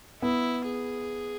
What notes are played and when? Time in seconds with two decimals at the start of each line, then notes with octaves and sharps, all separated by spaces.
0.22 B3 E4
0.66 G#4